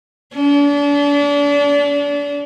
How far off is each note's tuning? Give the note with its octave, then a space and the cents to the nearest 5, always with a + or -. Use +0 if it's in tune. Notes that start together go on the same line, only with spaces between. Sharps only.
D4 -35